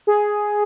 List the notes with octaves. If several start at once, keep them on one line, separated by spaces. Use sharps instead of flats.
G#4